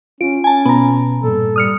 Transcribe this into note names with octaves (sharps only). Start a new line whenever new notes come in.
C#4 F4 D7
C#4 G#5 A5
B2 B3 A#5
G2 A#2 A4
G3 D#6 F6 C#7